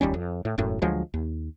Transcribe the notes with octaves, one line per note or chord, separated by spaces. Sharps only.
F1 D#2 G3 C#4
F2
A2
E1 F#2 A2
D2 F3 F#3 G#3
D#2